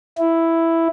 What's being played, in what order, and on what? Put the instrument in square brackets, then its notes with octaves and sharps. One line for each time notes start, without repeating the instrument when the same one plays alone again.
[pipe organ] E4